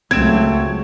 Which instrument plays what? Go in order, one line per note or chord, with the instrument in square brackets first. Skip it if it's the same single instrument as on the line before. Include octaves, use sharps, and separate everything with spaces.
[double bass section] C#2 F#3 [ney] A3 [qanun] C4 [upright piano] G#6 D7 E7